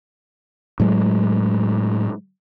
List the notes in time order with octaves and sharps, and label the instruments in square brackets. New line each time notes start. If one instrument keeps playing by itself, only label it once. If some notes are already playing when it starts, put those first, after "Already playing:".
[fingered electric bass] A2 F#3 G#3